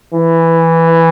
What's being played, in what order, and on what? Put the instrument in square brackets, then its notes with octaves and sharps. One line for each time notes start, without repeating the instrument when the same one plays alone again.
[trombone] E3